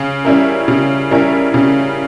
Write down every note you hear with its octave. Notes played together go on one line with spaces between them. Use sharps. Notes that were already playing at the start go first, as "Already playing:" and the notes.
Already playing: C#3
G3 C#4 E4 A#4
C#3
G3 C#4 E4 A#4
C#3